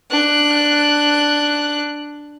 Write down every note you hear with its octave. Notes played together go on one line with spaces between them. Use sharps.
D4 F#6